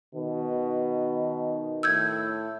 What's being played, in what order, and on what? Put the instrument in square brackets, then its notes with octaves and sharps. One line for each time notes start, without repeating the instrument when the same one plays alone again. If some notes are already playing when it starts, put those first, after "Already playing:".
[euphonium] B2 [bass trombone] D#3
[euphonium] A2 [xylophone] E6 G6 G#6